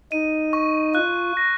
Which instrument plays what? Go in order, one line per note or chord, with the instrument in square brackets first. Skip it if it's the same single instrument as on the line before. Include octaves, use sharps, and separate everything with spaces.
[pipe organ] D#4 [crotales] D#7
[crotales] C#6
[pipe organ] F4 [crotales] F#6
[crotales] A#6